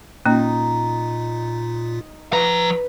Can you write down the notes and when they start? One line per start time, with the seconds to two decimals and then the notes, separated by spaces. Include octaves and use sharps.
0.26 A#2 A#3 C#4 D#4 F4
2.32 F3 B4 A#5